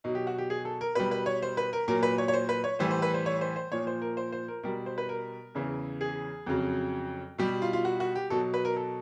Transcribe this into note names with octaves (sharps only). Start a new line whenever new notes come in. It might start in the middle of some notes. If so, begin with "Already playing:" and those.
B2 F#3 D#4
G4
F#4
G4
G#4
A4
A#4
B2 G3 B4
B4
C#5
C5
B4
A#4
A#2 F#3 A#4
B4
C#5
C#5
C5
B4
C#5
A2 E3 G3 C5
C5
B4
C5
C#5
C5
C5
A#2 F3 C#5
C5
A#4
C5
C5
A#4
B2 G3 A#4
C5
B4
A#4
E2 C#3 E3
G#4
F2 C#3 F#3
B2 G3 G4
F4
F4
F#4
F#4
G4
B2 F#3 A4
B4
A#4
A4